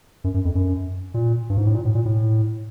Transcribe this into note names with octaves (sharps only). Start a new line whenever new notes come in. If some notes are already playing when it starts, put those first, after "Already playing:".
F#2
F#2
F2
F#2
A#2
G2
G#2
A2
A#2
A2
A#2
A2